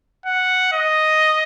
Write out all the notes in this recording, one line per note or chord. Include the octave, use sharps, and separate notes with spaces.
F#5
D#5